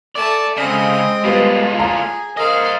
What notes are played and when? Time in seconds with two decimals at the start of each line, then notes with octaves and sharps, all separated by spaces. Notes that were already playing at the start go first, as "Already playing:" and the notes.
0.15 A3 D5 A5
0.57 C#3 G#3 C4 D#5
1.24 A2 G3 B3 F4
1.80 G#4 A#5
2.37 A#4 C5 D#5 F5